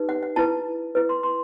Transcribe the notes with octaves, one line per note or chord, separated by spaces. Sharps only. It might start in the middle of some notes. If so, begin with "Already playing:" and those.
Already playing: D#4 G4 B4
F#5
F#5
E4 B4 A5
E4 B4
C6
C6